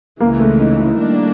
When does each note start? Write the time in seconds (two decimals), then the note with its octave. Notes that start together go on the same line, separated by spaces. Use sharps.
0.20 C#2 C#3 E3 G#3 A#3
0.40 A3
0.59 D#4
0.80 E4
0.98 D#3 G3 A#3 D4